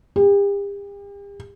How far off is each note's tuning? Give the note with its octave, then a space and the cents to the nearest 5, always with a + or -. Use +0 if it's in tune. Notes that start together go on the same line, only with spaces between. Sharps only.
G4 +40